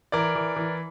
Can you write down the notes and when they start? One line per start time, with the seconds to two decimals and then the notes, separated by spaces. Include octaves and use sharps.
0.12 E3 A#4 D5
0.35 E3
0.56 E3